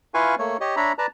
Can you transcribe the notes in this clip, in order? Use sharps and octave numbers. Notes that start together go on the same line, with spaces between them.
E4 F4 B4 F5 G#5 C#6
A3 A#3 C#5
G4 C#5 D#5
D4 C#5 E5 A#5 B5
B4 D5 A5 A#5